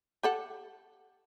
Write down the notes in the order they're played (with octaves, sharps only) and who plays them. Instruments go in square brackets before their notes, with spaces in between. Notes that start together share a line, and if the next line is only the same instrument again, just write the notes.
[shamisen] G4 A4 F#5